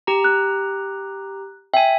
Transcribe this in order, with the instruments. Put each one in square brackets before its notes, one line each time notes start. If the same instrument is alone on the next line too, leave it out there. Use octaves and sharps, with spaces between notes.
[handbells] G4 A#5
[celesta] F#6
[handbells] E5 G#5 [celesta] G5